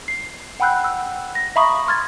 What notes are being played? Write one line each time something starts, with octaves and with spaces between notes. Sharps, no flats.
C7
F#5 G5 B5 E6 F#6 G6
E6
A#6
E5 F5 A#5 B5 C#6 D#6
C6 F6 G#6 A6